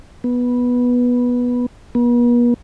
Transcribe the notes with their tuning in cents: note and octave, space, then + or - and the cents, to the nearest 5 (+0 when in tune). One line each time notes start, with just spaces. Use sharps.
B3 -10
B3 -45